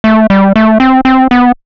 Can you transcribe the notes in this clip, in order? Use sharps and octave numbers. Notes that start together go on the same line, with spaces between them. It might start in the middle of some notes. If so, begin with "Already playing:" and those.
A3
G3
A3
C4
C4
B3